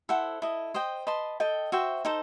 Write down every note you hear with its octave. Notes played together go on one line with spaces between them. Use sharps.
E4 A4 C5 F#5
E4 A4 D#5
C5 D#5 G5
B4 D#5 A5 C6
A4 D#5 G5
F#4 C5 E5 G5
D#4 A4 C5